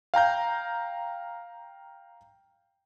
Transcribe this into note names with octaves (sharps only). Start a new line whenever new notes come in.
F5 G5 A#5 G6